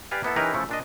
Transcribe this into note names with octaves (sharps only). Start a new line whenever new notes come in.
G4 B4 D5 F5 G#5
A#3 B3 E4 A4
E3 C#4 D#4 G4 A#4 B4
C#3 F3 A3 E4 A4
A#2 D4 D#5